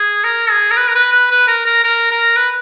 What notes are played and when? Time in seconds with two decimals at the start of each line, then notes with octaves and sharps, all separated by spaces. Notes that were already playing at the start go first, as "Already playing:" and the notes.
Already playing: G#4
0.24 A#4
0.50 G#4
0.71 A#4
0.77 B4
0.88 A#4
0.95 B4
1.12 B4
1.31 B4
1.48 A#4
1.66 A#4
1.84 A#4
2.11 A#4
2.36 B4